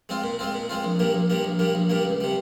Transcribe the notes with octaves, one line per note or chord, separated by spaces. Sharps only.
G#3 C4 F4
A#2
G#3 C4 F4
A#2
G#3 C4 F4
A#1
A#2 G3 A#3
A#1
A#2 G3 A#3
A#1
A#2 G3 A#3
A#1
A#2 G3 A#3
C#2
C3 G3